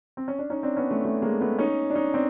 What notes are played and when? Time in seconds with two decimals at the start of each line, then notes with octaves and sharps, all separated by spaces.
0.17 C4
0.28 C#4
0.39 D4
0.50 C#4 D#4
0.63 C4 D4
0.77 B3 C#4
0.91 A3
1.05 A3
1.22 G#3 A#3
1.41 A3 B3
1.59 C#4 D#4
1.90 D4
1.95 C#4 D#4
2.14 C4 D4